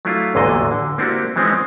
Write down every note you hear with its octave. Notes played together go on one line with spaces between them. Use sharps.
F#3 A3 D4 E4 F4
A1 E2 A#2 D3 F#3 D#5
D3
A#3 C4 D4 E4 F#4 G4
E3 F3 G#3 C4 C#4 D#4